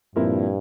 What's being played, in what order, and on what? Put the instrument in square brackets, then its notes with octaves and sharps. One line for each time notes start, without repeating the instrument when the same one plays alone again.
[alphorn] G2 [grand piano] A#2 F3 C4 E4 A#4